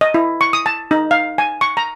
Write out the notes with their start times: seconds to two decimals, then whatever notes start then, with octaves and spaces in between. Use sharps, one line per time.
0.01 D#5
0.14 E4
0.41 C#6
0.53 D#6
0.66 A5
0.91 D#4
1.11 F5
1.38 G#5
1.61 C#6
1.77 A#5